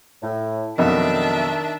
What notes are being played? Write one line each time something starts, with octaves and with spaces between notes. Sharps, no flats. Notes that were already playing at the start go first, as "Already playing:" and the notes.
A2
F2 B2 D#3 F#3 D4 E5 A5